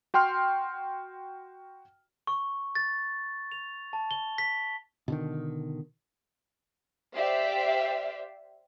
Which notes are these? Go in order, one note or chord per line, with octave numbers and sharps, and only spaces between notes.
F#4 G5 C6 F6
C#6
A6
F7
A5
G7
B6
B2 D3 D#3
G4 C5 D5 E5 F5